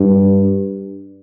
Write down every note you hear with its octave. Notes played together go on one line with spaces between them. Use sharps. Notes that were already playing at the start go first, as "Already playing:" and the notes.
Already playing: G2